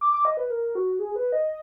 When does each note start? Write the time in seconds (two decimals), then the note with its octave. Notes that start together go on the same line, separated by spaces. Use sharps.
0.01 D6
0.13 D6
0.25 D#5
0.37 B4
0.50 A#4
0.75 F#4
0.99 G#4
1.16 B4
1.32 D#5